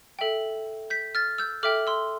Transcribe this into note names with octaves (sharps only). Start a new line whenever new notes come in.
A4 E5 G5
G6 B6
F6 A6
E6 G6
A4 E5 G5 D6 F6
C6 E6